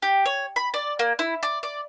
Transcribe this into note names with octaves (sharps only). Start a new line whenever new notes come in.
G4
C#5
B5
D5
A#3
E4
D5
D5